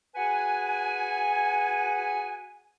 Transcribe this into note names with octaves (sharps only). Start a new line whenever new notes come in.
F#4 G#4 B4 F#5 G#5